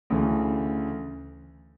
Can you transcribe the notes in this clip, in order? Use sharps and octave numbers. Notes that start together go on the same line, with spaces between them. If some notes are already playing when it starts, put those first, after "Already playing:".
D2 C#3 E3 A3